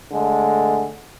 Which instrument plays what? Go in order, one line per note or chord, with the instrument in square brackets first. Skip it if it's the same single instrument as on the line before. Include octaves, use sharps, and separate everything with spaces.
[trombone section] D3 G#3 A3